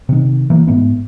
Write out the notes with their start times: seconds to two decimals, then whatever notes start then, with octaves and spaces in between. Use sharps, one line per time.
0.09 C3 D#3
0.50 E3 A#3
0.67 G#2 A3 B3